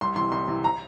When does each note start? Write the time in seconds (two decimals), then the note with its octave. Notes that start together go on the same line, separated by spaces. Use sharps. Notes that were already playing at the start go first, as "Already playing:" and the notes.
0.01 C2 C6
0.16 C3 E3 C6
0.32 C2 C6
0.48 C3 E3
0.64 A#5